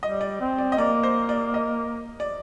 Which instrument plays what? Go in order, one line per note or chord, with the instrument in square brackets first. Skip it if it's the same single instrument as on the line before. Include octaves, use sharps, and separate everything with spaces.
[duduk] G3 [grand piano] D#5
[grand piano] D5
[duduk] C4
[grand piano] D5
D#5
[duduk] A#3 [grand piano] D5
[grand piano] C5
D5
D#5
D5